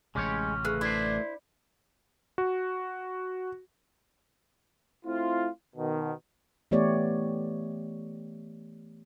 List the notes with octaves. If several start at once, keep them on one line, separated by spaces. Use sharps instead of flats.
A1 C3 G#3 C#4 G4 C#5
C#3 A3 B4 F#6
D4 E4 C5
F#4
A3 C4 E4 F4
B2 D#3
E3 A3 B3 G4 C#5 D5